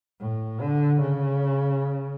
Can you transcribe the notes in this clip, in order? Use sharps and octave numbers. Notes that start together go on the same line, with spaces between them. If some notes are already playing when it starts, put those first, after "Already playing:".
A2
D3
C#3